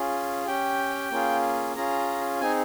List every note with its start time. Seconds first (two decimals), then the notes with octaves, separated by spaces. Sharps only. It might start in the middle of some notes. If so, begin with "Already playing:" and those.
Already playing: C#4 F4 G#4
0.47 C#4 G4 G5
1.11 A#3 C#4 F4 G#4
1.76 C#4 F4 G#4 A#5
2.40 C4 D#4 G#4 G#5